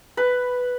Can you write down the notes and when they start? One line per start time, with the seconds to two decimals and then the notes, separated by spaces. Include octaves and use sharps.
0.17 B4